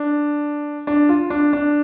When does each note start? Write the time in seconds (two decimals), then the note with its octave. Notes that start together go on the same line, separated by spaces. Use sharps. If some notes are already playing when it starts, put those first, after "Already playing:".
Already playing: D4
0.87 D4
1.09 F4
1.30 D4
1.53 D4